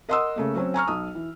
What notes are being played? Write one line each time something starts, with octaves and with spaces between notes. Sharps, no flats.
A#4 D#5 F#5 C6 D#6 E6
C#3 A3 A#3
F#3 C4 C#4 F#4
G#5 A#5 C#6 F6
B1 D#6
E3